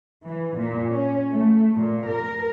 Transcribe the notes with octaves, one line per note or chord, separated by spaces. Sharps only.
E3
A#2
C#4
A3
A#2
A#4